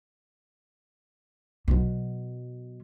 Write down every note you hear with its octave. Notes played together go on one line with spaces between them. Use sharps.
B2 F#3